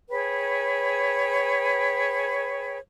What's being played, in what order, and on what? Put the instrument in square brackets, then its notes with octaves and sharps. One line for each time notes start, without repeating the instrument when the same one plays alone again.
[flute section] G#4 B4 C#5 G5